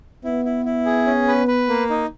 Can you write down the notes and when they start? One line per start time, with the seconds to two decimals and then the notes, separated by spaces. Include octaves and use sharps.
0.24 B3 E4
0.45 E4
0.65 E4
0.86 G#4
1.06 C#4
1.28 B4
1.48 B4
1.69 A#3
1.90 D#4